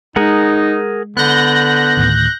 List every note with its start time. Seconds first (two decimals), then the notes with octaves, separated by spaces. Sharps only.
0.16 G#3 D#4 G#4 A#4 F#5
1.17 D3 B3 F#6 G6 A#6
1.97 D2 A2 D#3